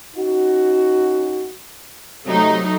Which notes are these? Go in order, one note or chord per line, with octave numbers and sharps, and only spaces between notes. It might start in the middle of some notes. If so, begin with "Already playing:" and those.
C#4 D#4 F#4
C3 F#3 A3 D#4